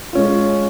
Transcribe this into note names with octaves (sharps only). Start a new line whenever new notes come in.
G#3 C#4 F4